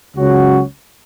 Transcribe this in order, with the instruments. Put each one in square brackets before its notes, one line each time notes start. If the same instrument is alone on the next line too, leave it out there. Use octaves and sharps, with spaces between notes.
[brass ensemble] C#2 C#3 F#3 C#4 F#4